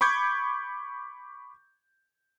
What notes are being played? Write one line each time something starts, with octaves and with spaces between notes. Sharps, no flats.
B5 C#6 D6 G6 G#6